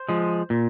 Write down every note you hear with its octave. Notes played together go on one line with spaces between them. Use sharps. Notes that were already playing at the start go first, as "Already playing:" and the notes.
Already playing: C5
F3 G#3
A#2